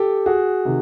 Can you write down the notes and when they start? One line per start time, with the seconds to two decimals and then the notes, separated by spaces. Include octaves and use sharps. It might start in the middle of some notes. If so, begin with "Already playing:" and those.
Already playing: G4 A4
0.26 F#4 G#4
0.65 C3 D#3